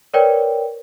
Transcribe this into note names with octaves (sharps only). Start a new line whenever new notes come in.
A#4 B4 C#5 D5 G5